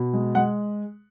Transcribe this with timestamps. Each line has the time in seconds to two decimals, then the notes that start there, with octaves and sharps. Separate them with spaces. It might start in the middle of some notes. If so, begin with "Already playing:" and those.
Already playing: B2
0.13 G#3
0.35 G#3 F#5